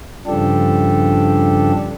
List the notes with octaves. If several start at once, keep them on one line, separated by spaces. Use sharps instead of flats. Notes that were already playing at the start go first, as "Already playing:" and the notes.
G2 C#3 F3 D4 G4 A4